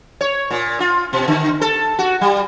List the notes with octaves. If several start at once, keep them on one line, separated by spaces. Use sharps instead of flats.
C#5
A#2
F4
B2
D3
A4
F#4
G3